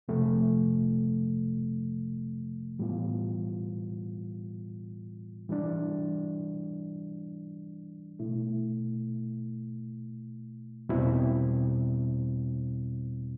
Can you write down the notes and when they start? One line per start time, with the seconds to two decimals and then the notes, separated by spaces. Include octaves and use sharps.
0.08 F2 C3 F3 A3
2.78 A2 E3 G3 B3 F4
5.49 E3 G3 D4
8.19 B2 A3 E4
10.89 E2 B2 G3 C4 E4